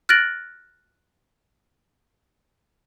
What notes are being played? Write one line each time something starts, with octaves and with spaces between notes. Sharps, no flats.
F6 F#6 A6 A#6 D7 F#7